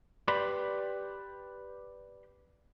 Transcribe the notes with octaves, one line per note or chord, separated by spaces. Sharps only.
G4 B4 D5 B5 C6